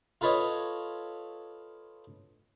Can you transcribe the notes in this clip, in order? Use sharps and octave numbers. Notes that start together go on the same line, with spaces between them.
F4 A4 B4 C#5 D#5